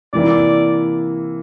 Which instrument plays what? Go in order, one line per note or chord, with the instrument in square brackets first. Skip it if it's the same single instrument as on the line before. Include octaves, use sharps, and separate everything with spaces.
[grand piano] C3 E3 A#3 E4 [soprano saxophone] D5